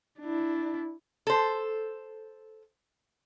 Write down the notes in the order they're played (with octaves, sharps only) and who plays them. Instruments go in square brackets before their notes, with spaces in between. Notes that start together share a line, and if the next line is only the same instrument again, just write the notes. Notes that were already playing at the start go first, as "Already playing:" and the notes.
[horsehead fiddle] D4 E4
[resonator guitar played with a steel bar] A4 C5